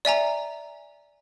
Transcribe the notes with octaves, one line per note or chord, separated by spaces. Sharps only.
D5 E5 G#5 A#5